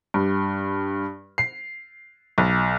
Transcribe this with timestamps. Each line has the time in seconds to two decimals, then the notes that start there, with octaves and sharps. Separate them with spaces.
0.14 G2
1.38 C7
2.38 B1